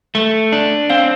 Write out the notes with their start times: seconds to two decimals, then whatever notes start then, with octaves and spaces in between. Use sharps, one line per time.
0.15 A3
0.52 D4
0.90 C4 F5